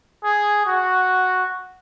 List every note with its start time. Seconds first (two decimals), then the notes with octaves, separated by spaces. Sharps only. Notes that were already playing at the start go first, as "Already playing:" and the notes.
0.24 G#4
0.66 F#4